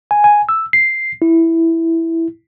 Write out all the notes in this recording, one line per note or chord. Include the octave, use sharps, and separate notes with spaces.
G#5
G#5
E6
C7
E4